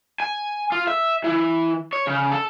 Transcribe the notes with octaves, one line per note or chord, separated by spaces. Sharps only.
G#5
F4
E5
E3
C#5
C#3
A4